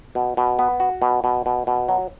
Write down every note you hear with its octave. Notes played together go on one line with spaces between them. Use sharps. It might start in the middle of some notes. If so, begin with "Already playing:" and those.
B2
B2
B3
F#4
B2
B2
B2
B2
F#3